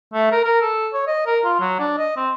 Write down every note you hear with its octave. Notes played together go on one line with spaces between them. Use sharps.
A3
A#4
A#4
A4
C#5
D#5
A#4
F4
F#3
D4
D#5
C4